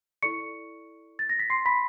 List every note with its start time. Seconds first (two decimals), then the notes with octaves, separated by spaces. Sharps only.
0.23 E4 A4 D5 C#6 C#7
1.19 A6
1.29 A#6
1.39 B6
1.50 C6 C7
1.66 B5 B6